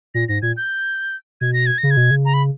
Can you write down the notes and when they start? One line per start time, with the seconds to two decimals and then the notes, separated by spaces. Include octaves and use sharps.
0.15 A#2 A#6
0.29 G#2 A#6
0.42 A#2 G#6
0.57 G6
1.41 B2 G#6
1.53 A#6
1.66 G#6
1.78 A#6
1.83 C#3
1.91 G#6
1.97 B2
2.11 C#3
2.25 A#5
2.34 B5